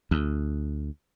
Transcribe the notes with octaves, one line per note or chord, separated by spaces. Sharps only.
D2